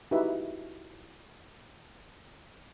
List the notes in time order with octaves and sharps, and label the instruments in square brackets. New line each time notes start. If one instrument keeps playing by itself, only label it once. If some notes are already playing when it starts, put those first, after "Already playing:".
[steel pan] D#4 E4 F#4 G4 B4 E5